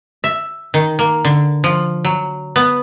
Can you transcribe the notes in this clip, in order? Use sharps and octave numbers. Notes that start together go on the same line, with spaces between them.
E5
D#3
A#3
D3
F3
F#3
B3